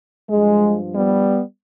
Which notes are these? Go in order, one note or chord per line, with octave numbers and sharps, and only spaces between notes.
G2 F3 G#3
G3 B3